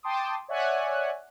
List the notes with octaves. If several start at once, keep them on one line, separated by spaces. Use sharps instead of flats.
G5 A5 C6 D6 D#6
C#5 D5 E5 F#5 G#5 F#6